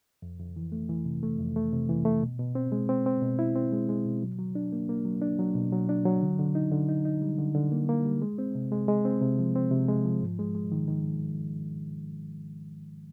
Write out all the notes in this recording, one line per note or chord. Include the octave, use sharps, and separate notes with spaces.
F2
F2
E3
A3
E3
C3
A3
F2
A3
C3
E3
A3
B2
B2
C4
G#3
C4
C4
B2
E4
C4
G#3
G#3
B2
F#3
F#3
D4
A#3
A#3
F#3
D4
F#3
B2
F#3
D4
F#3
D3
D3
D#4
D3
D#4
D#4
G3
D3
D3
A#3
A#3
G3
G#3
C4
C3
G#3
G#3
C4
C3
F3
C4
C3
G#3
F3
G#2
G#3
G#3
D#3
D#3